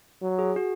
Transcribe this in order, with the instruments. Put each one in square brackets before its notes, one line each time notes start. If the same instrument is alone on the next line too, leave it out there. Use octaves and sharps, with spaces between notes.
[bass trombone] F#3
[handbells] G#4
F#4